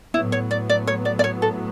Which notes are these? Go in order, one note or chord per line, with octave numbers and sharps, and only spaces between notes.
A2 F#3 B3 E4
C#5
D5
D5
C#5
D5
D5
C#5
A4